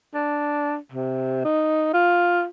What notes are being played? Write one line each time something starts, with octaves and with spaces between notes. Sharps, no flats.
D4
C3
D#4
F4